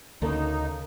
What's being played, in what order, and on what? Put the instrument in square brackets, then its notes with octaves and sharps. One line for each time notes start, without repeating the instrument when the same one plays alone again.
[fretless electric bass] D2 [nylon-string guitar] C#3 A#3 A4 [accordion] D#4